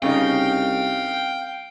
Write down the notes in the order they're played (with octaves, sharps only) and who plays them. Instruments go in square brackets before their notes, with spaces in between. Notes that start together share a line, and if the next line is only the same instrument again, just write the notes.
[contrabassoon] C2 [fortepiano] C#3 D#4 [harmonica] F5 [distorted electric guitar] G5